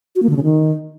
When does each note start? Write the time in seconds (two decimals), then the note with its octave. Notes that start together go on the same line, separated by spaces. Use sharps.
0.15 F#4
0.22 A#3
0.29 D3
0.36 C#3
0.43 D#3